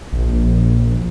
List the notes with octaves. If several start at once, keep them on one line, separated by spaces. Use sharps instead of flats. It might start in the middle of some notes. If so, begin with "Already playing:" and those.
A#1